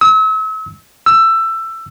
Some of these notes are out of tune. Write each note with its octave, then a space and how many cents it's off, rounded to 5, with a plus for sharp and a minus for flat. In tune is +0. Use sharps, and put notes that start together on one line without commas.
E6 -40
E6 +15